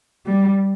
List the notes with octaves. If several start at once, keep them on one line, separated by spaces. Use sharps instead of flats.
G3